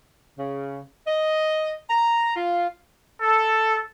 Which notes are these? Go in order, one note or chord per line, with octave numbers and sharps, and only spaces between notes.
C#3
D#5
A#5
F4
A4